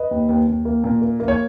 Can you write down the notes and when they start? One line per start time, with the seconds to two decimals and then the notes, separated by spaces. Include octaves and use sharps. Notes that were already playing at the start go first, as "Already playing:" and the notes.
Already playing: B4 D#5
0.11 D#2
0.29 D#2
0.47 D#2
0.65 A#3
0.84 A#2
1.02 A#3
1.20 A#3
1.28 C#5